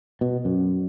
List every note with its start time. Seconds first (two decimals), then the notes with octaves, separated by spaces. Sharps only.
0.21 B2
0.45 F#2